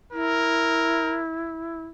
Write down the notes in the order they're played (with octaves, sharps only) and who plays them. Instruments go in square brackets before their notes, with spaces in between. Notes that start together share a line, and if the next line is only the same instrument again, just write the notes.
[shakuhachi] E4 [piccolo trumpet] A#4